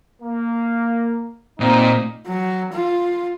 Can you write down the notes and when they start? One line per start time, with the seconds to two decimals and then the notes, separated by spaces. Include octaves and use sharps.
0.22 A#3
1.60 A#2 C4 D#4
2.28 F#3
2.72 F4